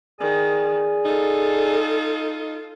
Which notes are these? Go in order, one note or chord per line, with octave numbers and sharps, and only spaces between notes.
D#3 G#4 D5 G#5
D#4 F4 A4